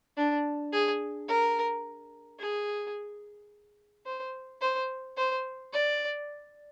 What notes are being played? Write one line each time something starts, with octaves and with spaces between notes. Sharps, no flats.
D4
G#4
A#4
G#4
C5
C5
C5
D5